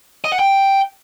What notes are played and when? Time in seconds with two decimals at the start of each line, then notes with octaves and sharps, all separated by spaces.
0.24 D#5
0.32 F#5
0.39 G5